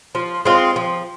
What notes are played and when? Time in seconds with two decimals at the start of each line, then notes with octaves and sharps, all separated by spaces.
0.15 F3
0.45 G#3 C4 F4
0.76 F3